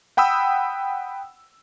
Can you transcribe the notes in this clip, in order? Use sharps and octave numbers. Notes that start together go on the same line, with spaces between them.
F#5 G5 B5 D#6 E6